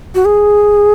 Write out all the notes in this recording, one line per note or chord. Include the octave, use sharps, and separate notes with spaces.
F#4
G#4